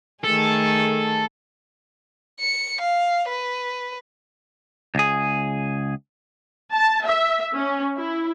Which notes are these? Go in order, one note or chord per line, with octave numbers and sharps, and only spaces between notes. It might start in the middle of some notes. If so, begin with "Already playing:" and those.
D#3 A3 G#4 A4
C#7
F5
B4
C#2 G#4
A5
E5
C#4
E4